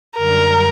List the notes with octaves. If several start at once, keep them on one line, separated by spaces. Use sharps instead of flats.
F#2 D3 G3 A#4